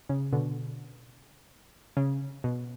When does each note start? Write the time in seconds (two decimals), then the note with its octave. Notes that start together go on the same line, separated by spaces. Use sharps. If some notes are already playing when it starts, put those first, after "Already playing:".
0.09 C#3
0.32 B2 D3
1.97 C#3
2.44 B2